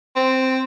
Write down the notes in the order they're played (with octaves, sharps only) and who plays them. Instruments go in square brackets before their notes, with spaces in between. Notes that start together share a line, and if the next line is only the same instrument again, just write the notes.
[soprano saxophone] C4